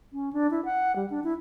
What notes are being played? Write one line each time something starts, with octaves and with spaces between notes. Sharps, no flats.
C#4
D4
E4
F#5
G3
D4
E4